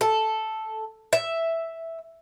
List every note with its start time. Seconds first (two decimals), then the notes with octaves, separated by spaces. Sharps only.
0.01 A4
1.13 E5